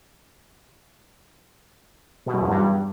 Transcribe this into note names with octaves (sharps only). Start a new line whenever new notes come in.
B2
F#2
E2
G2